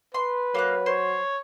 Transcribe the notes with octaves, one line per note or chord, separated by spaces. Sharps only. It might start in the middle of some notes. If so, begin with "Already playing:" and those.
B4 C6
F#3 A#3 F5 F#6
C5 C#5